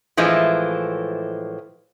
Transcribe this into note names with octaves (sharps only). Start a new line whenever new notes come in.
A2 E3 F3 G#3